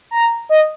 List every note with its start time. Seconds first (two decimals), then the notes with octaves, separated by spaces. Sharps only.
0.11 A#5
0.49 D#5